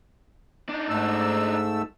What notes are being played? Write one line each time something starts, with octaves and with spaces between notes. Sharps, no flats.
D4 D#4
G#2 A3 E6